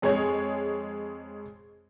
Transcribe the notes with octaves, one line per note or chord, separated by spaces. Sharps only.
F2 G#3 G#4 C#5 G#6